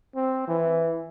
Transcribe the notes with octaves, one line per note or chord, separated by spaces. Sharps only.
C4
E3